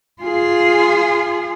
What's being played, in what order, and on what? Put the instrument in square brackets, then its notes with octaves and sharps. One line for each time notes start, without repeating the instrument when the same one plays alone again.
[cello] F4 G#4